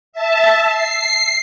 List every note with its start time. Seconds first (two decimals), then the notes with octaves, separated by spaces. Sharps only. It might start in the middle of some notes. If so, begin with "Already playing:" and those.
0.13 E5 A5
0.67 C7